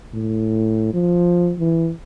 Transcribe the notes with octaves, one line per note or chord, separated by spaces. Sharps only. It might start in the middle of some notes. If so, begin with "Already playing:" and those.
A2
F3
E3